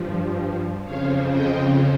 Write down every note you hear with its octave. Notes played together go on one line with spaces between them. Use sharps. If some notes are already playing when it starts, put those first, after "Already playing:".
Already playing: G2 F3
F2 C#3 F3 C#5 F5
D#5 G5